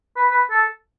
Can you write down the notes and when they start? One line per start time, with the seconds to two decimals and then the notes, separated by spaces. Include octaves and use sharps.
0.16 B4
0.31 B4
0.51 A4